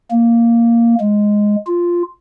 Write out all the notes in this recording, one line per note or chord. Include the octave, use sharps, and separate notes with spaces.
A#3
G#3
F4